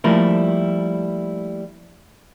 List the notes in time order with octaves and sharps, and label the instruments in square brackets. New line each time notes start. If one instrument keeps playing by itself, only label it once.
[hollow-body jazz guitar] F3 G3 A3 A#3 E4 A#4